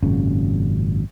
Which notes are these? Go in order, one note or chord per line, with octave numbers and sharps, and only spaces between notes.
G#1 F#2 A#2 C#3